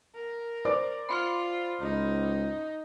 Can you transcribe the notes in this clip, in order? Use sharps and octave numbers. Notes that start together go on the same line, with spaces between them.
A#4
C5 D5 D6
F4 B5 C6 F6
C#2 D#4